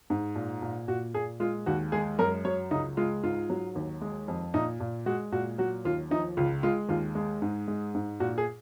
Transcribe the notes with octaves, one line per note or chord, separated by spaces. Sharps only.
G#2
A#2
A#2
A#2 F#4
A#2 G#4
G#3 F4
D#2 F#4
G#3 G#4
F#2 A#4
F#3 C#5
C#2 D#4
G#3 F4
G#2 F4
F#3
D#2
G#3
F2
A#2 D#4
A#2
G#3 F#4
A#2 F#4
F#3 F#4
D#2 F4
F3 D#4
C#2 F4
G#3 F4
D#2 F4
G#3
G#2
G#3
G#2
A#2 F#4
G#4